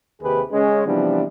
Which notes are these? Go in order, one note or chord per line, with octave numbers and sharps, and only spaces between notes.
D#2 C3 D#3 G4 G#4 B4
C#3 G#3 C#4
C3 E3 F3 G3 B3 D4